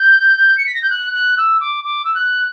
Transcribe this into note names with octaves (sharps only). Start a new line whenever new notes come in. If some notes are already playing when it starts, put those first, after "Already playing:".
Already playing: G6
C#7
B6
A#6
G6
F#6
F#6
E6
D6
D6
E6
F#6